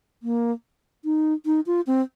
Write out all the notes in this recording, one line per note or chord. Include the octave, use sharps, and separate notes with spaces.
A#3
D#4
D#4
F4
C4